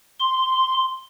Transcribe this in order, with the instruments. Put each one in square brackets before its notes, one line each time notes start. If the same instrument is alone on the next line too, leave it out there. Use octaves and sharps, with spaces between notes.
[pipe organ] C6